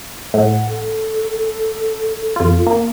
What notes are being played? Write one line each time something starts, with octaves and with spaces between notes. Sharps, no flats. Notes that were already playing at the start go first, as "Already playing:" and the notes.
A2 F#5
A4
F2 F4
A#3 A#4